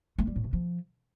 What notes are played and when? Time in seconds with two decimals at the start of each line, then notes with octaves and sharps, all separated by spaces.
0.18 A3
0.27 G3
0.36 A2
0.44 C3
0.53 F3